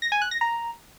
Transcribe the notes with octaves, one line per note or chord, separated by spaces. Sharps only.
A#6
G#5
F#6
A#6
A#5